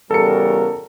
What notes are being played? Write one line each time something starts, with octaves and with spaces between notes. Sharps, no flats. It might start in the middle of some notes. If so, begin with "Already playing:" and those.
E2 C#3 G3 F#4 A4 A#4 C#7